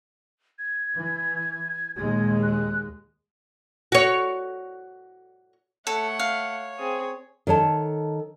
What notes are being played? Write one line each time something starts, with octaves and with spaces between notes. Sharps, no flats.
G#6
E3
D#2 A#2 G#3 G#6
F#6
F#4 C#5
A3 A4 C#5 F#5
F5
C4 G#4
D#3 A4 C#5 A5